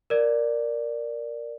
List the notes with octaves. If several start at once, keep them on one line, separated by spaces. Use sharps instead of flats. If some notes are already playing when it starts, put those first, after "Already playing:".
A#4 D5